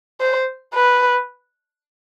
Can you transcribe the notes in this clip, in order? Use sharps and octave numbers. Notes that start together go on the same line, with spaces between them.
C5
B4